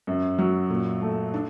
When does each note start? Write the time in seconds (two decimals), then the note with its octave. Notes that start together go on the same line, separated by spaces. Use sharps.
0.07 F#2
0.39 F#3
0.70 A#2
1.02 A3
1.34 D4